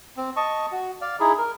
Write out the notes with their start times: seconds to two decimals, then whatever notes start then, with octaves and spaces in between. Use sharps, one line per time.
0.17 C4
0.37 D#5 A5 C#6
0.72 F#4
1.01 D5 F5
1.20 D#4 E4 G#4
1.38 A#4